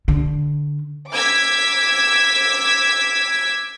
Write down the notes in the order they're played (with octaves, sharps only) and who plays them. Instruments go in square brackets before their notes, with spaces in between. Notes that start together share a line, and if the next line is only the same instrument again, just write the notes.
[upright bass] D3
[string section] D6 E6 G#6 B6